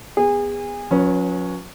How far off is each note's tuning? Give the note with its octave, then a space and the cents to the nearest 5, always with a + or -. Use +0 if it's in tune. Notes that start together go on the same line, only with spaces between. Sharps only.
B3 +0 G#4 -30
F#3 -40 C#4 +0 B4 -25